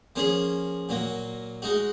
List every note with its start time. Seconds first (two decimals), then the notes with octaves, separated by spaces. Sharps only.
0.16 F3 A#3 C#4 G#4
0.89 A#2 F#3 A#3
1.62 G#3 D#4 F#4